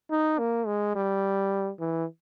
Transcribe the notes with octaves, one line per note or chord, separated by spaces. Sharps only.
D#4
A#3
G#3
G3
E3